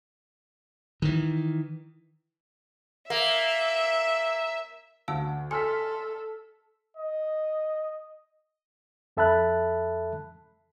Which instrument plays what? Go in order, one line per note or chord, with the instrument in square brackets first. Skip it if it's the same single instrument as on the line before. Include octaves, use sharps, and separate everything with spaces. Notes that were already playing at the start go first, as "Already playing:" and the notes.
[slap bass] D#3 E3
[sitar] A#3 [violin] E5
[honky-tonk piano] D2 [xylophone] F5 A5 E6
[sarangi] A4 [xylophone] G#5 [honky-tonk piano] C6 F6 B6
[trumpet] D#5
[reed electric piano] F2 A4 E5 A5 B5 F#6